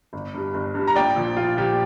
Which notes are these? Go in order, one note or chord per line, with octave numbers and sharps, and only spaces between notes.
G1
G2 G3
G1
G2 G3
A#5
A#1 D5 G5
A#2 F3
A#1 F4
A#2 F3 G4